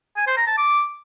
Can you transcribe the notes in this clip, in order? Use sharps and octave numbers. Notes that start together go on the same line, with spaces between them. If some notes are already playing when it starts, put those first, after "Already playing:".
G#5
C5
A#5
A5
D6